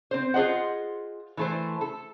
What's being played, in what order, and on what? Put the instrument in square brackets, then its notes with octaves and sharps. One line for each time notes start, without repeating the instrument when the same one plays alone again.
[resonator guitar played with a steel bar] C4 C5
F4 G#4 C5 D#5 F#5
E3 A3 C5
A4